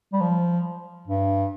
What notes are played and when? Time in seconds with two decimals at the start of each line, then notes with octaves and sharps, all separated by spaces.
0.13 G3
0.21 F3
1.07 G2